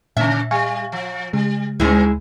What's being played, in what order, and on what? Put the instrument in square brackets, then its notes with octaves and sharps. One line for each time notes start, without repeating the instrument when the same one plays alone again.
[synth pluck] A#2 [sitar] C#3 C#4 [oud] E5
[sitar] G3 [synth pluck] F5 G#5 C#6
[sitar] F3
[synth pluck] C#3 G#3 [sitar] G3
[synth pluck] D2 [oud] G#3 E4 [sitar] B3 C#4 D#4